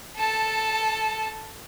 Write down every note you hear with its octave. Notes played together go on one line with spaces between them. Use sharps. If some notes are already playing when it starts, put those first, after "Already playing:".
A4 A5